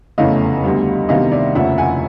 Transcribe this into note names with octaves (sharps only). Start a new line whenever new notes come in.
F1 E2 C#3 E3 A3 D#5 F5
D2 D3 G3 B3
D2 C3 D#3 G3 B3 D#5 F5
D5 E5
F1 D#2 C#3 F3 E5 F#5
F#5 G#5